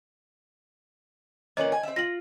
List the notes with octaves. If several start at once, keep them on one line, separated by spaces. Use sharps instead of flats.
A#2 E3 C#4 D#5 F#7
G#5
C4 E5
F4 A#6 F#7